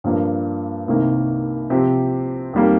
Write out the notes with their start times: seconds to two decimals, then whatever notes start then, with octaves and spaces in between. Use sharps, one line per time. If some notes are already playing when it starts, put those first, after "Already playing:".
0.04 G2 F3 A#3 D4
0.88 C2 C3 D#3 A#3
1.70 C3 F3 C4 G4
2.53 F2 D#3 G3 A#3